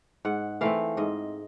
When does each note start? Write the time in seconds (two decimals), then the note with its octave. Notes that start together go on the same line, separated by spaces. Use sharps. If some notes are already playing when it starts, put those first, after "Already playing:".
0.25 G#2 F#5
0.61 E3 A3 C4 F5
0.97 G#2 D#5